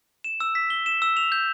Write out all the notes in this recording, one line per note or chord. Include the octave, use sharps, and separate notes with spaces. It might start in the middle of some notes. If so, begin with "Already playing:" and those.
E7
E6
B6
G7
E7
E6
F7
G6